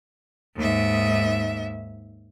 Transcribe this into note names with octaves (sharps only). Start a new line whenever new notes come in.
D#2 G#2 E5